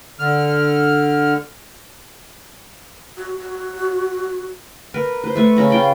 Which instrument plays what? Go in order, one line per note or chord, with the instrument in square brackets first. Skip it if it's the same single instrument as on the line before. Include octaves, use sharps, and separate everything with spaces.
[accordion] D3 F6
[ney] F#4
[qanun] A#4 B4
B4 C5
A3 B4 C#6
C#3 C#4 A#5 B5
F4 G5 B5